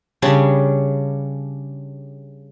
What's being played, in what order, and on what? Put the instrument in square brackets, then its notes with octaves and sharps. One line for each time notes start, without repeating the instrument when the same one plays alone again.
[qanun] C#3 G3 D4